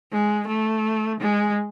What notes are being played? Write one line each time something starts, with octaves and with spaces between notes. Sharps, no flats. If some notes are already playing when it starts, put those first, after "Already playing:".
G#3
A3
G#3